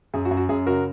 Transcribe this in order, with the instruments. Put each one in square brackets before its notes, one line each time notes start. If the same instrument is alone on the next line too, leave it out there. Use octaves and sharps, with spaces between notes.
[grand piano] F#2 G#4
F#4
F#2
F#4
F#2 G#4
C#3 F#4 A#4